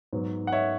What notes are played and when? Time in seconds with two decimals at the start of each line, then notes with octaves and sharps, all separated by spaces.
0.13 G#2 F#3 B3
0.47 F#5
0.52 C#5 E5